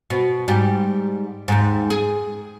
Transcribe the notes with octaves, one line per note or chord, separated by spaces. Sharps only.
B2
G#2 G3 G4
D#2 G#2
G#4